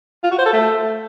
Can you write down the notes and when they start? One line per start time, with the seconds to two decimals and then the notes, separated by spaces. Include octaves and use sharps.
0.24 F4
0.31 F#4
0.38 C5
0.46 A4
0.53 A3